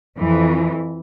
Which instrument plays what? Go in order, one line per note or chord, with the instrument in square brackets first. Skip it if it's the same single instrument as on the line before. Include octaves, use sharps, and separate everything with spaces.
[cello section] F2 E3